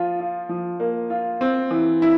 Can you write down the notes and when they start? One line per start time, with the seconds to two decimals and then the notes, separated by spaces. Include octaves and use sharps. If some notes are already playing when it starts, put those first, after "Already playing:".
Already playing: F3 F4
0.20 F4
0.49 F3
0.80 A#3
1.10 F4
1.41 C4
1.71 E3
2.02 E4